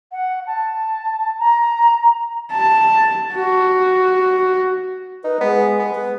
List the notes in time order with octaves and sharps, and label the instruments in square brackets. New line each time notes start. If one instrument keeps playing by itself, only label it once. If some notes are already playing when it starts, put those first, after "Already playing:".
[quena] F#5
A5
A#5
[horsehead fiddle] A5
F#4
[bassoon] D#4 [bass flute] B4
[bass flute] G#3 [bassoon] B3
[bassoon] B3
[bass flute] B4